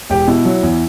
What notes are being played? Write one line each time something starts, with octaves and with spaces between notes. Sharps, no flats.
E1 G4
B2 E4
F#3
E2